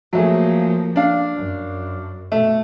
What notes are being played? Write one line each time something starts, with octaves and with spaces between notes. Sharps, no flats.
F3 F#3 A3 A#3 G#4
D4 F5
F#2
B2 A3